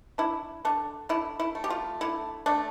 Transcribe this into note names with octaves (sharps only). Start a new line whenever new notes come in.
D4 E4
D3 D4
D3 E4
E4
A3
G4
F4
D3 E4
A3 D4